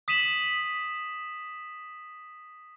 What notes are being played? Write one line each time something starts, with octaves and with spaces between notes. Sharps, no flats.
D#6 B6 D#7 E7 F#7